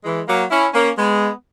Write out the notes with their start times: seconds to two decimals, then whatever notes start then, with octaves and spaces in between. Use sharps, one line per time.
0.04 E3 G#3
0.27 F#3 A#3
0.50 C#4 E4
0.73 A#3 C#4
0.96 G#3 B3